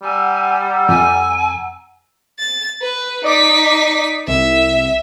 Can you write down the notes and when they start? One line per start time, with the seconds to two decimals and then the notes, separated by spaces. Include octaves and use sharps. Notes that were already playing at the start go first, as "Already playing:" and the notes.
0.03 G3 F#5 G#5 A#5 E6
0.89 F2 G#5
2.39 A6
2.82 B4
3.24 D#4 D5 D#5 D6 B6
4.28 C2 E5